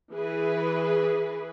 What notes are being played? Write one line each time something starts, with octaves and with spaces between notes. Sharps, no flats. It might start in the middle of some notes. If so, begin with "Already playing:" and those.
E3 G#4 B4